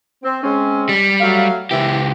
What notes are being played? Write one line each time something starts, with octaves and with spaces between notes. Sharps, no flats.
C4
G#3 C4 C#4
G3
F#3 A3 F5
C#2 E3 E4 G4